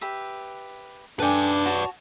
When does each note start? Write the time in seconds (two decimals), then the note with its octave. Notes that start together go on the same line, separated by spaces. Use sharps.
0.01 G4 B4 E5
1.20 D4 A4 B4 D5 G5 G#5
1.66 F#4 C#5 A5